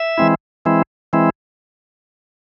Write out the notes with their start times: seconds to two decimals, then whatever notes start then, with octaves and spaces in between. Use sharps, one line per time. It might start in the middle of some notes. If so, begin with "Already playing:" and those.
Already playing: E5
0.18 E3 G#3 C4 E4
0.65 E3 G#3 C4 E4
1.13 E3 G#3 C4 E4